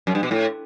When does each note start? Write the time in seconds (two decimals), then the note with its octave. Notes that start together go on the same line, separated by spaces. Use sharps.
0.07 F#2
0.15 G2
0.23 B2
0.31 A2